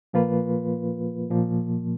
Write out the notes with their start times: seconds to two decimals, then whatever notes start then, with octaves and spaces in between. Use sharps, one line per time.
0.13 A#2 F3 A#3 F4 B4
1.30 A#2 F3 A#3